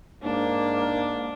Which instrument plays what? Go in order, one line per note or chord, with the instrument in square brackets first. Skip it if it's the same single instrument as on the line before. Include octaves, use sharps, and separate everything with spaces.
[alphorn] G#2 [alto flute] A#3 [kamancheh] D4